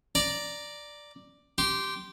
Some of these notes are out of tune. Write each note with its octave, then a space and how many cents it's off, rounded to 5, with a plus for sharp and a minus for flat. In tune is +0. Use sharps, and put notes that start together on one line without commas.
D5 +0 A#5 +0
G4 -15 C6 +0